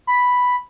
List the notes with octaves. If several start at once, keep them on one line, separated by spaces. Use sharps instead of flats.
B5